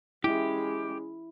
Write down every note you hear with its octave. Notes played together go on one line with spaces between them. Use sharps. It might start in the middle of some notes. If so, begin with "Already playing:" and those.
G#3 C#4 E4 G4